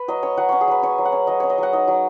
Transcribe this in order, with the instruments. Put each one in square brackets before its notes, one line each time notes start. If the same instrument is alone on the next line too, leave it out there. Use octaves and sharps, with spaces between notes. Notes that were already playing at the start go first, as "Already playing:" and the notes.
Already playing: [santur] B4
F#3 D#5
C#4 C#5
F#3 F#5
C#4 C#5
G#4
F#3 B4
C#4 C#5
F#3
F#5
C#4
F#3 D#5
C#4 C#5
D#5
F#3 F#5
D#4 D#5
F#3